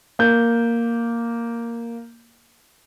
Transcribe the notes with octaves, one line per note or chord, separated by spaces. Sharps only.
A#3 G6